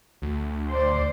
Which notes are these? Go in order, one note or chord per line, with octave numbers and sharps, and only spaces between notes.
D2
C5 D5